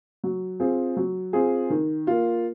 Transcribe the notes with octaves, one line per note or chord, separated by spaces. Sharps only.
F#3
C4 F4 G#4
F#3
C4 F4 G#4
D#3
A#3 F4